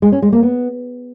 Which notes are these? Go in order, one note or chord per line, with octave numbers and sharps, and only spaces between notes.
G#3
C#4
G#3
A#3
B3